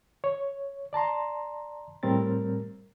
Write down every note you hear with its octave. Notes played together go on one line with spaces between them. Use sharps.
C#5
D5 A5 A#5 C6
A2 G3 C4 A#4 A6